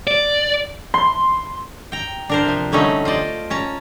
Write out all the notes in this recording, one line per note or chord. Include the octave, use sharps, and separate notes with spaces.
D5
C6
G5 A#5
D4 A#4 C5
C3 F3
D3 F#3 G3 A3 C#4 D#4
F4 C5 D5 D#5
C#4 A5 A#5